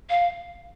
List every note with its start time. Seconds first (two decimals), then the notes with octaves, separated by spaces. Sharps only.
0.10 F5